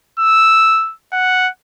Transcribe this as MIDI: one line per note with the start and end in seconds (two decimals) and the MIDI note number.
0.19 0.93 88
1.13 1.49 78